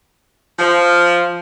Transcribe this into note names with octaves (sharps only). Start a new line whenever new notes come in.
F3